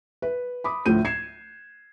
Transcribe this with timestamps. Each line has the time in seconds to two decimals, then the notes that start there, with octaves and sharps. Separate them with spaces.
0.22 B4
0.64 B5 D6 D#6
0.86 D2 A2 F3 G6 D#7
1.05 G#6 C7 E7